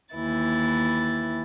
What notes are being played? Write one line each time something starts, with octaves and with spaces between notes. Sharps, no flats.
D#2 E3 E4 A6